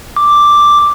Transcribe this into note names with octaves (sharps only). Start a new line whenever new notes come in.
D6